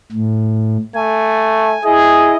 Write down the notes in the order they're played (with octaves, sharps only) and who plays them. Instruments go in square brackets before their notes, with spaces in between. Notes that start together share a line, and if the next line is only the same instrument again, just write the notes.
[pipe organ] A2
[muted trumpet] A3 [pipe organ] G#5
[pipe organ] E4 D#5 [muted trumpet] G#4